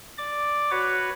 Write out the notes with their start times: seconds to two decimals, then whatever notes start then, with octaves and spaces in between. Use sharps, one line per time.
0.18 D5 D6
0.71 F#4 B4 C#5